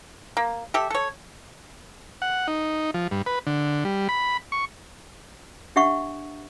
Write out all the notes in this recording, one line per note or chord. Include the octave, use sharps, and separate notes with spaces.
A#3
G4 A4 E5
A4 C#5
F#5
D#4
F3
G2
B4
D3
G3
B5
C#6
D4 G4 E5 F#5 C#6